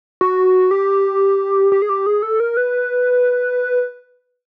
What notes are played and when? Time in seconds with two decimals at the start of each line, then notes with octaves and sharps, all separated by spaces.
0.21 F#4
0.71 G4
1.72 G4
1.82 G#4
1.89 G4
2.06 G#4
2.23 A4
2.40 A#4
2.57 B4